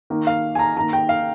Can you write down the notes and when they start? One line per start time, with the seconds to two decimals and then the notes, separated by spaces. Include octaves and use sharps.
0.10 D#3 A#3
0.27 F5
0.55 G#5
0.59 A#5
0.76 D#3 A#3 A#5
0.93 G5
1.09 F5